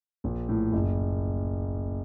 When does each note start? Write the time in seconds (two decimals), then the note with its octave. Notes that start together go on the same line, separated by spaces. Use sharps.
0.24 A#1
0.49 A2
0.73 F#1